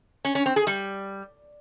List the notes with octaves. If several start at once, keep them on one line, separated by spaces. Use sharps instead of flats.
C#4
C#4
C4
G#4
G3